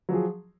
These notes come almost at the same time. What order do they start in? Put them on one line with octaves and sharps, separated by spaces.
F#3 F3 G#4